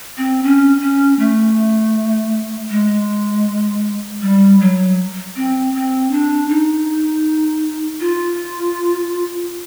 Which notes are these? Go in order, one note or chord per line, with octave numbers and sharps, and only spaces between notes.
C4
C#4
C#4
A3
G#3
G3
F#3
C4
C4
D4
D#4
F4